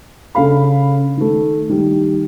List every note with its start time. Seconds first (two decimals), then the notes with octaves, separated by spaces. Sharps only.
0.35 C#3 D4 A4 F5 B5
1.17 D#3 A3
1.69 D#3 G3